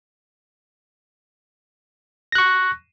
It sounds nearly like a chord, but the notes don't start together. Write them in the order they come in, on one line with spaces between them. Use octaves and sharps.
A#6 F#6 C#6